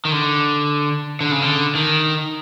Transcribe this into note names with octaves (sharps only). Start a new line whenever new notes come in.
D#3
D3
D3
C#3
D3
D#3